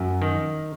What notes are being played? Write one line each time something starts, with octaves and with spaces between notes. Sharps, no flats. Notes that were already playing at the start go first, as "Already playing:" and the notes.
Already playing: F#2
D#3